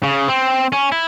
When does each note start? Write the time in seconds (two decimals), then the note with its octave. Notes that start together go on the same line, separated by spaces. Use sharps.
0.03 C#3
0.28 C4
0.72 C#4
0.92 E4